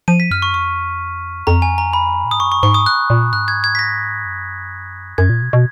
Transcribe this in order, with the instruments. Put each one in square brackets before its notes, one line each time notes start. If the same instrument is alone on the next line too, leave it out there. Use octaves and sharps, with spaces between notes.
[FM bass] F3 [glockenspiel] D#7
[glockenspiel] B6
[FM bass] F#2 [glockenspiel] F6
[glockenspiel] C#6
[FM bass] F2 [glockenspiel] C#6
[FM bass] F2 [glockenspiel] A#5
[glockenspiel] G#5
A#5
B5
[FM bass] A#2
[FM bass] G#2 [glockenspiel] D#6
[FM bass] F#2 [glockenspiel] C#6
[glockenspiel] C#6
[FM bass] G#2 [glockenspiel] C#6
[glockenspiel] D#6
F#6
[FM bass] A#2
[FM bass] G#2 [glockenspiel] F#6
[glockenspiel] G#6
G#6
B6
A#6
[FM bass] F#2
[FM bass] F#2 [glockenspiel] G#6
[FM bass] A#2
B2
B2